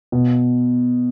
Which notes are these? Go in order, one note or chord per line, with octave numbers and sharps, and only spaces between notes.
B2